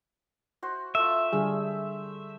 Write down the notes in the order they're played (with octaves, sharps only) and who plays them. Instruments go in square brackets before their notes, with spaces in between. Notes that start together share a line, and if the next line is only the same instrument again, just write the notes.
[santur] F#4 C5
[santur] A3 F4 [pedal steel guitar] E5
[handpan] D3 G3 G#4 [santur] E6